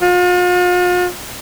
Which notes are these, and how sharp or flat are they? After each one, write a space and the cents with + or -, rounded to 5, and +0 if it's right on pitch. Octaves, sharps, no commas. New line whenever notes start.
F4 +40